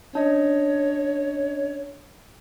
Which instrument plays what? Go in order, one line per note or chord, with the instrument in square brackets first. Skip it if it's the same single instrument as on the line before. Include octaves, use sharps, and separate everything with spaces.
[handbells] C#4 D4 D#5 [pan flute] C#5